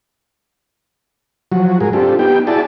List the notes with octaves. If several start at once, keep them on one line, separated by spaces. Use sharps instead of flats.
F3 F#3 F#4
G#2 G#4 A#4
C4 D4 F4 G4 A4
B3 D#4 G4 G5
E4 F#4 G#4 D5 A5